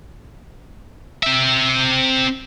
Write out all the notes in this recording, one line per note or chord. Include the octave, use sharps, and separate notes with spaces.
C4 E5